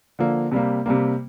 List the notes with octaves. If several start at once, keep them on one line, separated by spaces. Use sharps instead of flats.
D3 F3 A#3
C3 G3 A#3
C3 G3 A#3